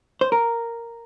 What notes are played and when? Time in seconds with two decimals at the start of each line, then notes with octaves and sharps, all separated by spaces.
0.21 C5
0.32 A#4